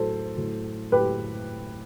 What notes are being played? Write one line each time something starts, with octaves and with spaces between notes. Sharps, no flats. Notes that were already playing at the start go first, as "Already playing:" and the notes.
Already playing: A2 F#3 A4 C5
A2 F#3
A2 F#3 G4 B4